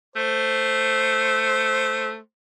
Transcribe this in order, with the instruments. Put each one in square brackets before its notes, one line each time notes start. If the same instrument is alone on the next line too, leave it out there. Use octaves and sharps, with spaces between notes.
[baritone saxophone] A3 [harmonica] C5